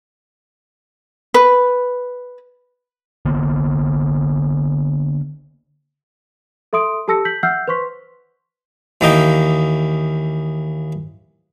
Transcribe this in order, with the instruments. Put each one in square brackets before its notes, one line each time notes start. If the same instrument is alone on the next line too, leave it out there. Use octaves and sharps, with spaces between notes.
[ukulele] B4
[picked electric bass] D3 A#3 B3
[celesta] A4 E5 C6 D#6 D7
G4 A4 A5 E6 A#6 C#7
G6 B6 F#7
E5 F#5 E6 F6 G6 C7
B4 C5 C6 C#6 B6
[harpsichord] D#2 E3 A#3 D#5 G5